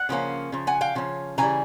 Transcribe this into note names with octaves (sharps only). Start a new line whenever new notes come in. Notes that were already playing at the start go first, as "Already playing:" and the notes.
Already playing: F#5
C#3 F3 A#3 C#4
C#3 F3
F#5 G#5
F5 G5
C#3 F3 C#4
C#3 E3 G3 G#5 A#5